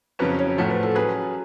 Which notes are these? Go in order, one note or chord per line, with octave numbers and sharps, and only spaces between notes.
F2 C#3 F#3 C#4 B4
C#5
A2 F3 A3 C#4 F#4 C#5
B4
A4
F#3 C#4 G#4 B4